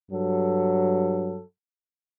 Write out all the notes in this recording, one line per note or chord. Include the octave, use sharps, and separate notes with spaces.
G2 F#3 A4